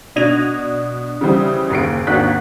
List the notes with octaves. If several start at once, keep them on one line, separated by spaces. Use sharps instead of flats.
B2 D4 G#6 A#6 D#7 F7
C#3 E3 G3 C5
F#1 D#2 C7 D7
G#1 D#2 D4 F#4 F#6 B6